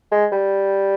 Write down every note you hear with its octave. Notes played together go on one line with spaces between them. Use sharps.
G#3
G3